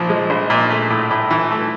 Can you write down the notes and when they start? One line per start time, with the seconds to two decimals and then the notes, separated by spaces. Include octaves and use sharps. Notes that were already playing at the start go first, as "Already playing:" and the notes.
Already playing: A#1 A#2 F3
0.10 G#3
0.30 A#1
0.50 A#2
0.70 A3
0.90 A2
1.11 A2
1.30 E3
1.51 A3